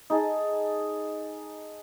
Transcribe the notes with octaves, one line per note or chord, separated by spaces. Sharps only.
D#4 G#4 A4